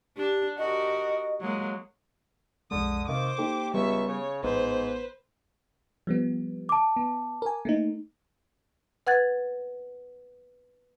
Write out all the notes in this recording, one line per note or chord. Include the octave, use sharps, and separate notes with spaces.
D4 G4
F#4 G4 A#4 D#5
F#3 G#3 A#3
B1 F2 D3 G#3 D#6
C3 D#3 C5 F5 D6
A#3 D#4 G4 A4
C#2 G3 B3 E5 C#6
C#3 C#5
A1 G#2 B3 B4 C5
F3 G3 B3
A5 D6
B3
A#4 G#5
A3 A#3 D#4
B4 F#5 F#6 G#6 A6